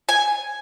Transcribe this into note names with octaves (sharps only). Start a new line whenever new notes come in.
G#5